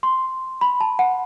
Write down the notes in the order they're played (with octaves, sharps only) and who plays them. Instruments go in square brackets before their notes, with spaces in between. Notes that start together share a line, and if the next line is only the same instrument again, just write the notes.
[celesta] C6
B5
A5
F#5